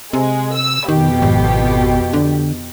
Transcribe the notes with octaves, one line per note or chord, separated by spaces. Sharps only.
C3 G#3
E6
F2 B2 D#3 G4
G#1
D3